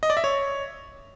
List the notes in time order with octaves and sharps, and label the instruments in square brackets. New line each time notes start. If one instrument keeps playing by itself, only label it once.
[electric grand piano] D#5
D5
E5
C#5